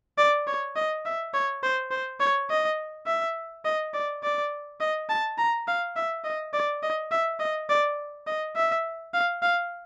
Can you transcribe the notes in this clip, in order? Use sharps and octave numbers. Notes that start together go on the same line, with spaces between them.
D5
C#5
D#5
E5
C#5
C5
C5
C#5
D#5
E5
D#5
D5
D5
D#5
A5
A#5
F5
E5
D#5
D5
D#5
E5
D#5
D5
D#5
E5
F5
F5